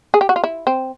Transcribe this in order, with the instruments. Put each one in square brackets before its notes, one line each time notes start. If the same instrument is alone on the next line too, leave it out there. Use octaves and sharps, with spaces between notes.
[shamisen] G#4
G4
F#4
F4
E4
C4